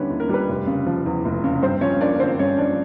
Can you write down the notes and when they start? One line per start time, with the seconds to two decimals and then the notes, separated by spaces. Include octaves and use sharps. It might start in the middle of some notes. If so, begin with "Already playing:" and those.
Already playing: D#2 D3 G3 B3 C#4 E4 B4 C#5
0.10 D#2
0.20 A#4
0.29 G3 B4
0.49 F1
0.67 C#3
0.86 F3
1.06 E2
1.25 F1
1.44 C#3
1.63 G2 C4 C5
1.81 F3 C#4 C#5
2.01 A#3 D4 D5
2.19 D3 C4 C5
2.39 G2 C#4 C#5
2.58 F3 D4 D5